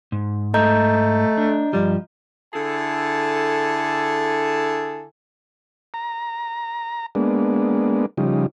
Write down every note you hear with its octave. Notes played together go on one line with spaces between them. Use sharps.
G#2
A3 D#5 A#5 G6
D4
G2 F3 G3
D3 E4 G#4 A4 G#5 A5
A#5
G#3 A#3 B3 D4
C#3 F3 G3 D#4